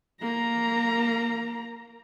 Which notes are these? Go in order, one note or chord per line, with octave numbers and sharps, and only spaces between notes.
A#3 A#5